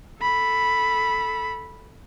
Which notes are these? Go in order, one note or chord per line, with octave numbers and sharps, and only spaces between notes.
A4 B5